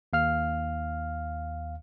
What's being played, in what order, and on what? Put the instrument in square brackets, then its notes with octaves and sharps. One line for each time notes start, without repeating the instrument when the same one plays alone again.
[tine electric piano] D#2 F5 F6